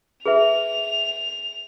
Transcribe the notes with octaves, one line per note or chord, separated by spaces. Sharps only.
G#4 B4 E5 F7